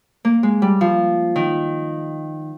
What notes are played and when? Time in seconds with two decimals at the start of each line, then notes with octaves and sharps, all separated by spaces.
0.25 A#3
0.43 G#3
0.62 G3
0.81 F3
1.36 D#3